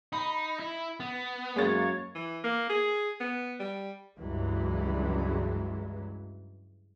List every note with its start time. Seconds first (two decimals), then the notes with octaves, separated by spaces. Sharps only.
0.13 D#4 B5
0.60 E4
1.00 B3
1.56 F#2 G#3 A#3 C#5 A6
2.15 E3
2.44 A#3
2.70 G#4
3.20 B3
3.59 G3
4.19 C#2 G2 E3 F#3 G#3